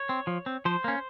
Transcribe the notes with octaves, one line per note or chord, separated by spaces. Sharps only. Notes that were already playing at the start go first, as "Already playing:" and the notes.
Already playing: C#5
C4
F3
C4
F3 C5
A#3 C#4